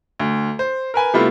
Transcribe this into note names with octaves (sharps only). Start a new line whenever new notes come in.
D2
C5
A#4 B4 G#5
C3 G3 A3 B3 E4 F4